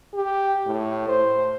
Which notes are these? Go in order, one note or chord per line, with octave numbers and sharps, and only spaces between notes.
G4
A2
C5